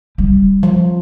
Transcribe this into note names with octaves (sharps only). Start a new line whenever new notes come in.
G3
F3